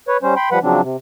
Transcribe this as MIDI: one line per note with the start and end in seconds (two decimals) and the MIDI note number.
0.08 0.17 71
0.08 0.17 73
0.23 0.35 55
0.23 0.35 61
0.23 0.35 72
0.36 0.49 79
0.36 0.49 83
0.36 0.49 84
0.52 0.59 53
0.52 0.59 55
0.52 0.59 71
0.52 0.59 78
0.52 0.59 83
0.63 0.81 49
0.63 0.81 53
0.63 0.81 54
0.63 0.81 60
0.63 0.81 62
0.83 0.97 48